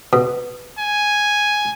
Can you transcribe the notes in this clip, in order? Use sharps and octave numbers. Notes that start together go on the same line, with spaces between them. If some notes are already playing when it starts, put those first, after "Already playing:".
B2
G#5